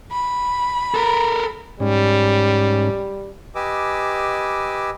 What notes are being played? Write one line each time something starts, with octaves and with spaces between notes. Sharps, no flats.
B5
A4 A#4
G#2 G3 C#4
G4 B4 D#5 G#5 D6 E6